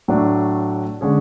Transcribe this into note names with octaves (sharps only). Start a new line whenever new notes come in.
A2 F#3 A3 D4
D3 G#3 C#4 G#4